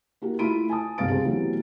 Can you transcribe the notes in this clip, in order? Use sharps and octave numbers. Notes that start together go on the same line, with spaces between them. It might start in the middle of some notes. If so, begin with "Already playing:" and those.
A#3 E4 F#4 G4
A3 E4 F4 B5 D7 D#7
G#5 A5 D#6
G1 C2 C3 F5 A6 D7
C3 G#4 C5
B2 E3 F#3 A3 G4